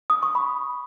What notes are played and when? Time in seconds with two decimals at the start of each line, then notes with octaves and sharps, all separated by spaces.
0.10 D#6
0.23 C#6
0.35 B5